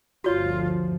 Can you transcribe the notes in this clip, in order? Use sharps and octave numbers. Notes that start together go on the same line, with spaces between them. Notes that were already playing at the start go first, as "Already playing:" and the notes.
G1 D2 F3 F4 F#4 C#5